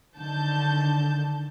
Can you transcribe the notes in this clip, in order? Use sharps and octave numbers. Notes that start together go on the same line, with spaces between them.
D3 D#3 A5 G6